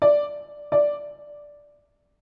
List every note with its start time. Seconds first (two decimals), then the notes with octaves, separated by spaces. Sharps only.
0.02 D5
0.72 D5